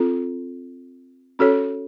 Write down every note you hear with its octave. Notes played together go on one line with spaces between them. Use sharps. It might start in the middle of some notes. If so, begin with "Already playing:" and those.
Already playing: C4 F4 A4
C#4 F#4 A4 C#5